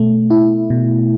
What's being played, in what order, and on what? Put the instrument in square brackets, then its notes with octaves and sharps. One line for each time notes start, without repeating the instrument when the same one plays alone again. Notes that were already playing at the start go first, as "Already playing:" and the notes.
Already playing: [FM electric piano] B2 A3
E4
B2